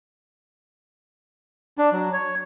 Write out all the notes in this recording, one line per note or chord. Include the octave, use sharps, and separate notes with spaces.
D4
F#3
C#5